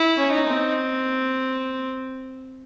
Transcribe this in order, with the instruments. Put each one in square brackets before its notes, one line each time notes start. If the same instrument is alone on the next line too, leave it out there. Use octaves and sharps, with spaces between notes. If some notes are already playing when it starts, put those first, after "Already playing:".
Already playing: [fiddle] E4
[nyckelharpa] C#4
[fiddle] D#4
[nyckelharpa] C4